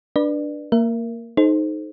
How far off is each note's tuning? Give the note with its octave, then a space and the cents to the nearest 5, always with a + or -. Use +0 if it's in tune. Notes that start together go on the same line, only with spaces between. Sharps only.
D4 +0 B4 -20 D5 +25
A#3 -15 A#4 +0 E5 +30
D#4 +0 A4 -40 C5 +0